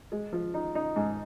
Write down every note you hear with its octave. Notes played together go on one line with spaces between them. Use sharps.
G#3
F3
D#4
D#4
G#2